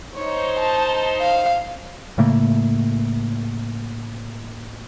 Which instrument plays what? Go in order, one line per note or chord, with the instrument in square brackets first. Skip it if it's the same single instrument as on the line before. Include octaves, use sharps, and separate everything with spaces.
[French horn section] D#4 C5 [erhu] C#5
[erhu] A5
F5
[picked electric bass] A2 C#3 A3 A#3